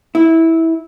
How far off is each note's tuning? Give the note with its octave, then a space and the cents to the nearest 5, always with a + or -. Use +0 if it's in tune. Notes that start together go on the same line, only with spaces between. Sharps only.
E4 -15